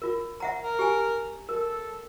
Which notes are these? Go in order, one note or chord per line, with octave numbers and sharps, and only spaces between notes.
F4 A#4
E5 F#5 A#5
A#4
G4 G#5
A4 A#4